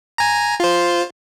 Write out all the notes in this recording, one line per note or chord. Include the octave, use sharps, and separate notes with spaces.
G#5 A#5
F4 C5